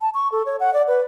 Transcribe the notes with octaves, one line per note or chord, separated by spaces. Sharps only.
A5
C#6
A4
C#5
F#5
D5
B4